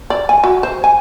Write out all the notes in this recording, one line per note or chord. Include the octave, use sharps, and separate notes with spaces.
D5
G#5
F#4
C5
G#5